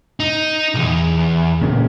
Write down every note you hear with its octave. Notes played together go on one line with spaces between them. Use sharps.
D#4
B1 E2
A#2 C#3